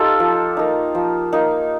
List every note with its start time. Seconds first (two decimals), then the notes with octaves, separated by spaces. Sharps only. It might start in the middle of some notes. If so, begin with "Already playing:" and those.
Already playing: D#4 F4 G4 A4
0.20 F3
0.57 A#3 D#4
0.95 F3
1.33 A#3 D#4